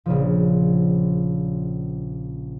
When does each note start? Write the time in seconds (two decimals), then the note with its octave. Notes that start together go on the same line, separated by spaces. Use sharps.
0.06 A#1 C#3 F3